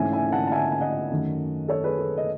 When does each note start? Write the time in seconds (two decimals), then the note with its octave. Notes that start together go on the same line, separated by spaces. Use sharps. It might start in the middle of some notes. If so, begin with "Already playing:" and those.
Already playing: G#2 E3 A3 C#4 E5 G#5
0.12 E5 G#5
0.32 F#5 A5
0.47 A5
0.52 E5 G#5
0.72 G#5
0.81 D#5 F#5
1.11 F#2 D#3 A3 C#4
1.68 A4 C#5
1.84 G#4 B4
1.99 A4
2.17 D#5